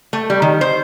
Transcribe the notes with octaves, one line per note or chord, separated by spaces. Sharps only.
A3
G3
D#3
C5